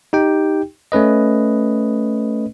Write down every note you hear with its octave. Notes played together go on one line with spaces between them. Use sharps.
D#4 G4 G5
A3 C#4 B4 D#5